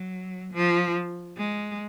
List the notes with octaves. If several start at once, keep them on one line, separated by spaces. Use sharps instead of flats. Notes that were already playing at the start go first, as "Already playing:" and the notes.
Already playing: F#3
F3
G#3